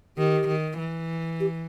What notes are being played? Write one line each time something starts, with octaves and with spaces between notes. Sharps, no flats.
D#3 G4
D#3
E3
G4